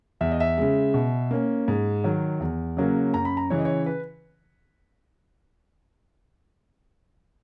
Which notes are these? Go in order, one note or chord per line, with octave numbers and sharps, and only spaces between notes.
E2 E5
D#5
E5
C#3 G#3
B2
A#3 C#4
G#2
D#3 F#3
E2
C#3 F#3 A#3 C#4
F#2 A#5
B5
A#5
C#3 E3 C#5
D#5
C#5
B4